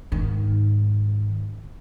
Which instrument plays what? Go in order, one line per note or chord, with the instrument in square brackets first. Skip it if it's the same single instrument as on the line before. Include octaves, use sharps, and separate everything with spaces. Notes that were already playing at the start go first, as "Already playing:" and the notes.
[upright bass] G#2 D#3